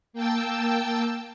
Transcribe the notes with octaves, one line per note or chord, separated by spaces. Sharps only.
A#3 G5 A5 E6